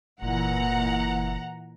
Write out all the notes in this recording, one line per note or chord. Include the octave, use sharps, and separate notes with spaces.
F#1 A#2 E3 F#5 A#5